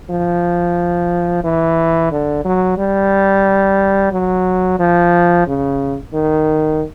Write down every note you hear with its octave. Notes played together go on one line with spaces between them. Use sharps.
F3
E3
D3
F#3
G3
F#3
F3
C#3
D#3